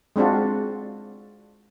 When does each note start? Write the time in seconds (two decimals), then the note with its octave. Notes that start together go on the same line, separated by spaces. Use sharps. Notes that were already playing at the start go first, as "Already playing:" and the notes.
0.16 G#3 C4 D4 F4 F#4